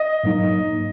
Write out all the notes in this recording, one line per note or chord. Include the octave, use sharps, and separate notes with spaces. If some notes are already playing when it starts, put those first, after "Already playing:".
Already playing: D#5
G#2 F#3 A#3 D#4